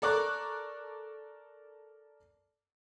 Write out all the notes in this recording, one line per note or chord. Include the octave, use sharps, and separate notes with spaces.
A4 A#4 D5 C#6 D6 F#6